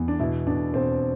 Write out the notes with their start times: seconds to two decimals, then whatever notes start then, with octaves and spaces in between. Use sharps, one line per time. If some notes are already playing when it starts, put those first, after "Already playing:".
Already playing: E2
0.08 D4
0.19 B2 E4
0.47 B2 D4
0.74 B2 C4